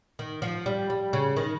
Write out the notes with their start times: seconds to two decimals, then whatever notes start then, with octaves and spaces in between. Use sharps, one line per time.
0.19 D#3
0.42 F3
0.66 G3
0.90 G3
1.13 C#3
1.37 D#3